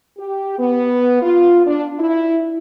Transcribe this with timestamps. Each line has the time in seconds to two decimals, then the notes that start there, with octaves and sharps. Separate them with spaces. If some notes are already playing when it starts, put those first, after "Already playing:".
0.18 G4
0.59 B3
1.22 F4
1.65 D4
1.98 E4